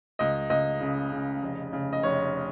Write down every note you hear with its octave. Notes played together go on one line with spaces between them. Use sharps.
C#2 D#5
C#2 D#5
C#3
C#3
F1
C#3
D#5
F1 C#5